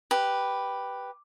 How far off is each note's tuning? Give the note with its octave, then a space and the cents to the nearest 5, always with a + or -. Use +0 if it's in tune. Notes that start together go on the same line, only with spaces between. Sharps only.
G4 +0 B4 +0